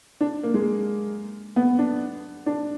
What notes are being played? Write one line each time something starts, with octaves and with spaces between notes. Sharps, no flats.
D4
A#3
G#3
B3
D4
D4